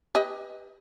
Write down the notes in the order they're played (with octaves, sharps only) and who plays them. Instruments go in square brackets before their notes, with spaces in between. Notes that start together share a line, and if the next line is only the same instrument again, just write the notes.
[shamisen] G4 B4 D#5